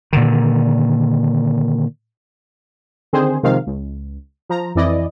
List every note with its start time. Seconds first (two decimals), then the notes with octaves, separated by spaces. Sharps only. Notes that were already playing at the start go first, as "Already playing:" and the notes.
0.13 A#2 D3 D#3
3.13 D3 D#3 C4 G#4 C5
3.43 C3 D#3 F3 G#3 F5
3.67 C#2
4.49 F3 A#5
4.75 F2 E3 E4 D5 D#5